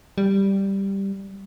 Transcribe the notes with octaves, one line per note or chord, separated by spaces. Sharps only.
G3